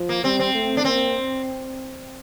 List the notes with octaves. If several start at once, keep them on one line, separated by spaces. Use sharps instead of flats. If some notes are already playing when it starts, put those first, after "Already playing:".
Already playing: F3
A#3
G3 C4
C4
A3
D4
A#3 C4